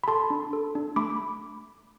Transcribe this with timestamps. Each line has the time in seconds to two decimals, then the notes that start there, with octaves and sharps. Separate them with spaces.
0.04 B5
0.08 A4 A5 C6
0.30 D4
0.53 A4
0.75 D4
0.96 A3 B5 D6